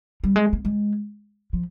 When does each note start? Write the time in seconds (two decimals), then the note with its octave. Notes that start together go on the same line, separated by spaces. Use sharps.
0.24 G3
0.36 G#3
0.53 A#3
0.65 G#3
1.53 F3